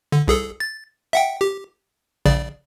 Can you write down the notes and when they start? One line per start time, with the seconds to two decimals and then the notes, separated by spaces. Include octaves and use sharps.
0.12 D3
0.28 C2 G#4 A4
0.60 A6
1.13 E5 F#5 G5
1.41 G4
2.26 A#1 C#3 D5